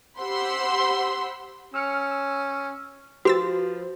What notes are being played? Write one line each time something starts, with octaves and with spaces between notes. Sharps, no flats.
G4 C5 F#5 B5 C6 E6
C#4 E6 F6 C#7
E6
F3 F#4 G4 B4 C5 E6 A6